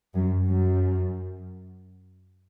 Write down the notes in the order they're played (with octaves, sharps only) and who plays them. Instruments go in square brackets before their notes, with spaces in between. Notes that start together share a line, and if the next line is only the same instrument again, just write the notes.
[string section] F#2
F#2